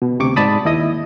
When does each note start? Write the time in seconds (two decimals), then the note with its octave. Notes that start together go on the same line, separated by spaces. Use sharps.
0.02 B2
0.19 D2 C3 C#6 D6
0.36 G#2 D5 A5 B5 D#6
0.65 D#2 E4 D#5 D#6